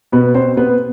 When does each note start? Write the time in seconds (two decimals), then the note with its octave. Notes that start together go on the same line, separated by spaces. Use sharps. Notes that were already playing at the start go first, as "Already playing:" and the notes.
0.12 B2 B3 B4
0.34 C4 C5
0.57 B3 B4